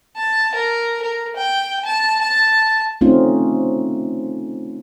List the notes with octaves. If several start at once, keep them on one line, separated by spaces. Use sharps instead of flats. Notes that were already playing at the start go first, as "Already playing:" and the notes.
A5
A#4
A#4
G5
A5
A5
A3 C4 C#4 D#4 F4